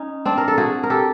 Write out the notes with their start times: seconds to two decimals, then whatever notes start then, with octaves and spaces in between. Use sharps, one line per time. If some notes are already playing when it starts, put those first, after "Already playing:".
Already playing: C#4 D#4
0.25 C4 D4
0.38 A#4
0.48 A4
0.58 F#4 G#4
0.83 A#4
0.90 G4 A4